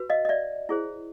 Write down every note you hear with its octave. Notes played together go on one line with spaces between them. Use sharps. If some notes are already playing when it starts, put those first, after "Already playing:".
Already playing: F#4 B4
D#5 F5
D#5
D5 E5
E4 G#4 C5